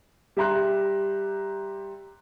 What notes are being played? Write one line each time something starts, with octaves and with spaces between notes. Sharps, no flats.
G3 G4 E5 A#5 C6 F#6